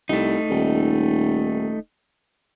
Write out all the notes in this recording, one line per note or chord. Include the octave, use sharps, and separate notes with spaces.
C2 A3 D#4
D#1